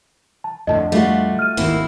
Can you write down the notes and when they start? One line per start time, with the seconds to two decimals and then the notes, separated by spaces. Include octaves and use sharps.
0.44 A5
0.67 F2 A2 D3 D#5 A5
0.92 G3 A3 F4 F#4
1.39 F6 D#7
1.57 G#1 D#2 A#3 C4 E4